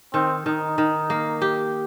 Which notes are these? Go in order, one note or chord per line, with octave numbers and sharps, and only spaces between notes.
D#3 C4
D#3 D#4
D#3
A#3
G4